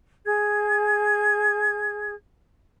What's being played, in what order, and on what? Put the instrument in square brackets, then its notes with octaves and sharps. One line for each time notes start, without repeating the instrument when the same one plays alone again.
[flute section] G#4 G#6